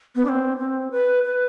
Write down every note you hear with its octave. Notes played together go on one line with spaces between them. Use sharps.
B3
D4
C4
C4
B4
B4